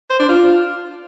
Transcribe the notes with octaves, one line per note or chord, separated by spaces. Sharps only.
C5
D4
F4